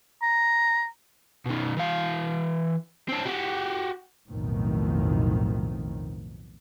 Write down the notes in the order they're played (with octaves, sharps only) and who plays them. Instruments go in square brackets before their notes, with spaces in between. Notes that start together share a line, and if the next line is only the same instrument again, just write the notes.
[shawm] A#5
[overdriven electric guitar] B2 D#3
E3 F5
C4 D4
F#4 G4
[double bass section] B1 F2 A2 D#3